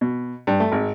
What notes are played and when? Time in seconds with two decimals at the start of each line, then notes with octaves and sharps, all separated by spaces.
0.01 B2
0.47 G2
0.60 A3
0.72 G#1